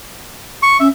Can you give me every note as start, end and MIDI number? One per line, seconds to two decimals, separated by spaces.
0.63 0.77 85
0.80 0.88 61
0.80 0.88 76